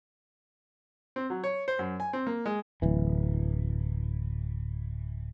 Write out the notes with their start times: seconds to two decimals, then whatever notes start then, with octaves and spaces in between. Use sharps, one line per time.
1.16 C4
1.30 F#3
1.44 C#5
1.68 C5
1.79 F#2
2.00 G#5
2.13 C4
2.27 A#3
2.45 G#3
2.82 D1 E3